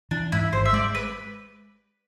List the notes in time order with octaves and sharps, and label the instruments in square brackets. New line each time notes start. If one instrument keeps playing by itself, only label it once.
[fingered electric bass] E3 [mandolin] D4
[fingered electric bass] G#2 [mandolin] E4
[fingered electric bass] G#1 [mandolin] C5
[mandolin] E5
[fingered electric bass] G#3 [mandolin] D5
[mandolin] B4